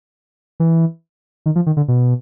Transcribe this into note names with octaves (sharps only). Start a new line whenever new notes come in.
E3
D#3
F3
D#3
D3
B2